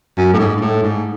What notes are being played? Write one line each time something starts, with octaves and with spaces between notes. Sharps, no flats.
F#2
A2
G#2
G#2
A2
G#2